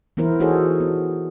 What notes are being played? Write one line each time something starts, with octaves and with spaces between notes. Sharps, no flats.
E3 B3 E4 A#4 C5
D#4 F#4 G#4 A4 C5 C#5
B3